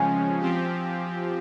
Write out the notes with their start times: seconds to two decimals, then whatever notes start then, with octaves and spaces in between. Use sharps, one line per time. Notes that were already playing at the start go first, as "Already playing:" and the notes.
Already playing: C#3 F3 G#3 C#4 G#5
0.40 F3 C4 G4